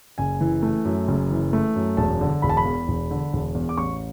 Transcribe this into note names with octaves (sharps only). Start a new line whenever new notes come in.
F#1 G#5
E3
A3
F#2
F#1
E3
A3
F#2
E1 A5
D3
E1 B5
A5
B5
E2
E1
D3
E1
E2
D6
A1 C#6